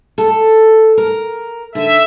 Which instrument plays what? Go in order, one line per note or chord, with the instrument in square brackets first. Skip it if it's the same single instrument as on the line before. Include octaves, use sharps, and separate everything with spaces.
[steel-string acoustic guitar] A4
A#4
[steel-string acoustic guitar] D3 [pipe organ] E5